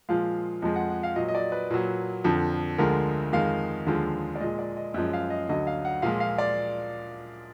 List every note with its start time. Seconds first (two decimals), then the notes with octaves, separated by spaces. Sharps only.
0.09 A#2 F3 G#3 F5
0.62 F2 F3 G#3 D#5
0.76 F#5
0.90 F#5
1.03 F5
1.16 A#2 F#3 D#5
1.28 D#5
1.35 D5
1.52 B4
1.70 A#2 F#3
2.24 F2 D3 F3
2.78 D2 D3 F3 G#3 A#4
3.32 F2 D#3 G#3 F5
3.86 D#2 D3 F3 G#3
4.35 D5
4.40 A#2 G#3 D#5
4.59 D5
4.77 D#5
4.94 F#2 F3 G#3 D#5
5.13 F5
5.30 D#5
5.49 D2 D3 F#3 D#5
5.67 F5
5.85 F#5
6.02 A#2 F3 G#3 F5
6.20 F5
6.38 D5